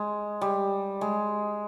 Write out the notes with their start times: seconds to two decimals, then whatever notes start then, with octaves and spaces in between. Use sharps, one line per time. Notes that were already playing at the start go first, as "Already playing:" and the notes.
Already playing: G#3
0.41 G3
1.01 G#3